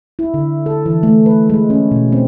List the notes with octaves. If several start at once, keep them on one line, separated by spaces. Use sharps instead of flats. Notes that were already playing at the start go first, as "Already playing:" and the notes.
E4
D3
A4
E3
A3
B4
G#3
C#4
B2
C4